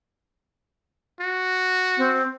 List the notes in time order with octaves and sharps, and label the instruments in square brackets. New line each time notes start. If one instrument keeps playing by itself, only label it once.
[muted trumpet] F#4
[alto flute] C4